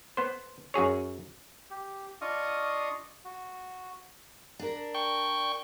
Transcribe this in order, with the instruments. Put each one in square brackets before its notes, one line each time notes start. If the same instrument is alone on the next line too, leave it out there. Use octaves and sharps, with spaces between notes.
[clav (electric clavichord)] B3 C5
F#2 F#4 G#4 C#5
[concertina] G4
D4 F4 D#5 F5 C#6 D#6
F#4
[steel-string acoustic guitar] D4 A#4
[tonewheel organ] G5 C#6